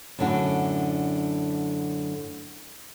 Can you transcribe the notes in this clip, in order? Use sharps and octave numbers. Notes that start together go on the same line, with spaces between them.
F#2 A2 D3 D4 F#4